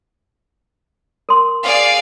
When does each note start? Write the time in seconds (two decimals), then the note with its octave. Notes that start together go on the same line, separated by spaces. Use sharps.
1.29 A#4 C6
1.64 G#4 D5 F5